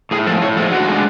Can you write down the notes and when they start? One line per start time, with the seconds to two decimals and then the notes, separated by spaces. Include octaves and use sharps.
0.11 A2 G#4
0.27 F3 A4
0.30 G#3
0.41 A2 C#5
0.57 F3 G#3 A4
0.72 D3 F#4
0.87 G#3 D4